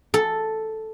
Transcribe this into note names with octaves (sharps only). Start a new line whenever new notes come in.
A4